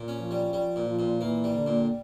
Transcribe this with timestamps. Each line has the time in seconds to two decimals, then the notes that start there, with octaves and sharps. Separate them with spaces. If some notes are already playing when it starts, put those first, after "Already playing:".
Already playing: A#2
0.08 C#4
0.20 F3
0.31 G3
0.53 F3 G3
0.76 A#2
0.87 F3
0.99 A#2
1.21 E3 A#3
1.44 G3
1.55 D3
1.66 A#2